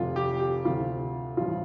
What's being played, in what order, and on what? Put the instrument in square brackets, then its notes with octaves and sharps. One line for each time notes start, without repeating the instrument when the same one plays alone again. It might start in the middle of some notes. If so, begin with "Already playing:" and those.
Already playing: [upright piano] F1 F2 C3 F4
G4
G4
D2 C3 F3 F4
A1 G2 F3 F4